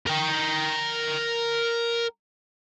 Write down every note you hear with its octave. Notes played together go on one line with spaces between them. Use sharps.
A#4 G5